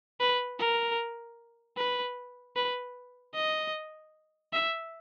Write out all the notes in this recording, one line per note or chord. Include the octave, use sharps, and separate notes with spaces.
B4
A#4
B4
B4
D#5
E5